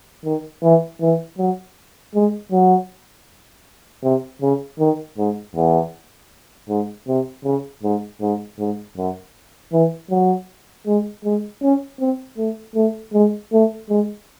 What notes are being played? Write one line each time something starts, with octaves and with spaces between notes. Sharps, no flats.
D#3
E3
E3
F#3
G#3
F#3
C3
C#3
D#3
G#2
E2
G#2
C3
C#3
G#2
G#2
G#2
F#2
E3
F#3
G#3
G#3
C#4
C4
A3
A3
G#3
A3
G#3